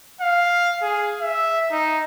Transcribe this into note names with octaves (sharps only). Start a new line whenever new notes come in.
F5
G#4
E5
D#4